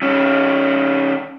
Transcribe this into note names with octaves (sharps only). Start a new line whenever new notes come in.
D#3 C#4